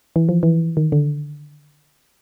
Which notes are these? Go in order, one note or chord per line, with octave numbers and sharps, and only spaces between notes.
E3
F3
E3
D#3
D3